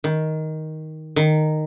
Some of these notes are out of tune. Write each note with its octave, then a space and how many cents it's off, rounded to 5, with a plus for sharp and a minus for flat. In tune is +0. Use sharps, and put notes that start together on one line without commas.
D#3 +10
D#3 -10